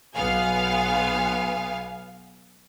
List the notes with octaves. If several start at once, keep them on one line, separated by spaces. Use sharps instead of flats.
B1 B3 F5 G#5